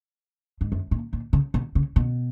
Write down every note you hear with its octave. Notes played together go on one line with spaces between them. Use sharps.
G#2
F#2
A#2
A#2
C#3
B2
C#3
B2